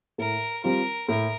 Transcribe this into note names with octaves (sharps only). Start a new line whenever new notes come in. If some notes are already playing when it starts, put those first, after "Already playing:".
A2 A#4
G3 C4 F4 A#4
A2 A#4